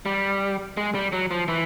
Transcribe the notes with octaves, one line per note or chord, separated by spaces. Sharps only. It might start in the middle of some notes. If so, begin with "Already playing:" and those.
G3
G#3
G3
F#3
F3
E3